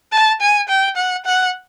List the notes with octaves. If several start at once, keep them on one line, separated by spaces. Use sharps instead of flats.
A5
G#5
G5
F#5
F#5